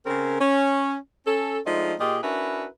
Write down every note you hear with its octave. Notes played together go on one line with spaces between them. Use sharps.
C#3 C4 A#4
C#4
C#4 A4
F3 G#3 A3 C4 D4 D#4
A#2 F4 G4 G#4 D#5
C#4 D4 E4 F#4 A#4 B4